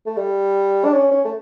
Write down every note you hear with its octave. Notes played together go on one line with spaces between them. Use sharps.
A3
G3
D4
C#4
C#4
A3